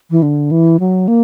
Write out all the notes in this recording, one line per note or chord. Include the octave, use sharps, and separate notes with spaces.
E3
D3
E3
F#3
A#3